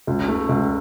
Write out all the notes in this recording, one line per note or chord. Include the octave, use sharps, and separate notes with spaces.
C#2
A3
C#2